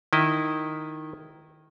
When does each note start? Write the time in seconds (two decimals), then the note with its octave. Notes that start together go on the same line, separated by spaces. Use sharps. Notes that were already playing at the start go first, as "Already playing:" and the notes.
0.13 D#3 E4 D#5